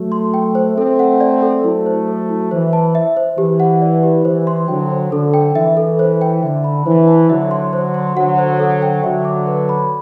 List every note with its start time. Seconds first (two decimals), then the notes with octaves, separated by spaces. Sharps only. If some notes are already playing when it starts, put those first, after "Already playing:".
Already playing: F#3 A3
0.12 C6
0.34 G5
0.55 C5
0.77 A3 C4 A4
0.99 F#5
1.21 D5
1.42 A4
1.64 F#3 A3 E4
1.86 C5
2.08 A4
2.29 E4
2.51 E3 C5
2.73 A5
2.95 E5
3.17 C5
3.38 E3 G4
3.60 F#5
3.82 D5
4.03 G4
4.25 E3 C5
4.47 C6
4.68 D3 F#3 G5
4.90 C5
5.12 D3 A4
5.34 G5
5.55 E3 E5
5.77 A4
5.99 C5
6.21 G5
6.43 D3 E5
6.64 B5
6.86 E3 C5
7.08 A5
7.29 D3 F#3 E5
7.51 C6
7.73 C5
7.94 C6
8.16 D3 F#3 F#5
8.38 C5
8.60 A4
8.82 G5
9.03 D3 F#3 E5
9.25 D6
9.47 B4
9.69 B5